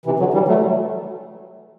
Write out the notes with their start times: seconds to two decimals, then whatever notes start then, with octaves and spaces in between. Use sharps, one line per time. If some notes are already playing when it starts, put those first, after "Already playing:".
0.06 C3 E3
0.20 D3 F#3
0.34 E3 G3
0.48 F#3 A3